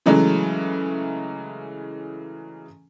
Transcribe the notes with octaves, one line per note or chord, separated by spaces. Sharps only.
C#3 E3 F#3 G#3 A3